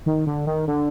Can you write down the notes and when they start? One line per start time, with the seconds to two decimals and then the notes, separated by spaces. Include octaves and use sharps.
0.06 D#3
0.27 D3
0.47 D#3
0.67 D3